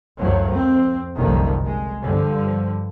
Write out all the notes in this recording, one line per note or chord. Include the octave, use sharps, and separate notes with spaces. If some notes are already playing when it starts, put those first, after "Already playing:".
C#2 F#2 A2 D#3 F3 F#3
F2 C4
F#1 C2 F#2 D3 D#3 F3
G#3
G2 D3 F3